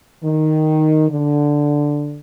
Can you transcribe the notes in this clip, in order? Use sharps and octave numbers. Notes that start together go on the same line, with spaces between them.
D#3
D3